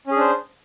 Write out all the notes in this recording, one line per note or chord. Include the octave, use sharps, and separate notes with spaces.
C#4 D4 G#4 C5